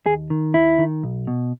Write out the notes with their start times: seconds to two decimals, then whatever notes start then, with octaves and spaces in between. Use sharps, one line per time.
0.06 D#2 G#4
0.30 D#3
0.54 D#2 E4
0.79 D#3
1.03 B1
1.27 B2